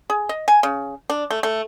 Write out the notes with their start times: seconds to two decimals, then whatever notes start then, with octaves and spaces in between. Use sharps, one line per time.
0.10 G#4
0.29 D#5
0.48 G#5
0.63 C#3
1.10 D4
1.30 A3
1.43 A3